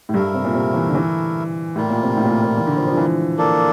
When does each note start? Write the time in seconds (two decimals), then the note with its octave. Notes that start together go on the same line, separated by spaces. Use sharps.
0.09 A2
0.14 G2 A3 E4 A#4
0.34 C3
0.45 A#2
0.55 C3
0.74 E3
0.89 D3
0.95 E3
1.76 A2 G3 A#3 F4
1.90 A#2
2.03 C3
2.17 A2
2.25 A#2
2.29 A2
2.44 A#2
2.57 E3
2.67 D3
2.77 F3
2.87 F3
2.92 D3
2.97 E3
3.38 A#3 D4 A4